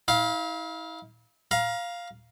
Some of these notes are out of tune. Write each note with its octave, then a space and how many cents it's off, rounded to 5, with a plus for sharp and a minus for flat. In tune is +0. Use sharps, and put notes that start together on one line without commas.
E4 -40 F5 +0
F5 +0 A#5 +30